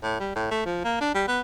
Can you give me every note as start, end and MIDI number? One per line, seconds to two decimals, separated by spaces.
0.03 0.20 45
0.20 0.32 55
0.35 0.47 45
0.51 0.61 57
0.66 0.84 53
0.84 0.96 58
1.01 1.14 62
1.15 1.25 55
1.28 1.41 59